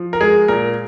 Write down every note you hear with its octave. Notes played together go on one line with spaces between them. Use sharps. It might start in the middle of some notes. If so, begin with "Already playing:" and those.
Already playing: F3
A#4
G#3 G#4
A#2 A#4